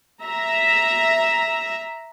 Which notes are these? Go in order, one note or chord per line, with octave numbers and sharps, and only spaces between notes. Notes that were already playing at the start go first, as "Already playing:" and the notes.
E5 A#5